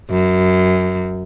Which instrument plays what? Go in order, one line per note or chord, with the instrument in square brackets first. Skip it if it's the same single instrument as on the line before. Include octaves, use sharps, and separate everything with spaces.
[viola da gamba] F#2